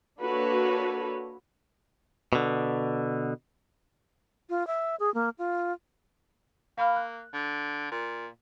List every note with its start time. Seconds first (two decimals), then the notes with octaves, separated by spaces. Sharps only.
0.20 A#3 D4 F#4 A4 B4 C#5
2.33 B2 D3
4.50 F4
4.67 E5
5.00 G#4
5.14 A#3
5.39 F4
6.78 A#3 F5 B5 F6
6.96 F#6
7.33 D3
7.91 A#2